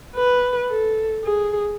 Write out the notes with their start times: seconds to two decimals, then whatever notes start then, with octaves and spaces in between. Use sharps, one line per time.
0.16 B4
0.70 A4
1.24 G#4